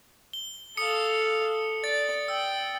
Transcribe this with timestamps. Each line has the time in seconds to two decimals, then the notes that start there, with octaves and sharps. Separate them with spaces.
0.33 G7
0.77 A4 F5 D#6 C#7
1.84 D5 A6
2.28 G5 E6